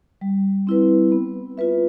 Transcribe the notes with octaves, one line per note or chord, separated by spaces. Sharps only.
G3
C4 E4 B4
B3
F4 B4 E5